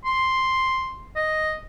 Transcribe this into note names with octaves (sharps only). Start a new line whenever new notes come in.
C6
D#5